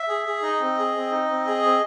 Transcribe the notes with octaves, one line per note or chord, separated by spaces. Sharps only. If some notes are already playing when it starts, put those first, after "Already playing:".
Already playing: E5
G#4
G#4
D#4 D#5
C4
G#4
C4
D#4
C4
G#4
C4